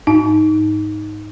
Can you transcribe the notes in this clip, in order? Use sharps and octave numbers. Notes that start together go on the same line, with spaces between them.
G#2 D#4